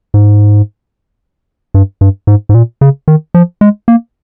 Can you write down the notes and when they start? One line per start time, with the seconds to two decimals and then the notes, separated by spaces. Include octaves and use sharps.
0.14 G#2
1.74 G2
2.01 G2
2.27 G#2
2.49 G#2
2.54 A#2
2.81 C#3
3.08 D#3
3.34 F3
3.61 G#3
3.88 A#3